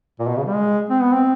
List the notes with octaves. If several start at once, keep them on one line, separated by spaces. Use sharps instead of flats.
A#2
B2
C#3
G3
G#3
C4
B3
C4